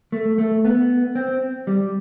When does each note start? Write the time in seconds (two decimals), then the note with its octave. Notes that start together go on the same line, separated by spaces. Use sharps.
0.12 A3
0.38 A3
0.65 B3
1.15 C4
1.67 G3